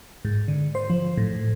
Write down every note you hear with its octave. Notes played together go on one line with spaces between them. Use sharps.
G#2
D3
C5
F3
A2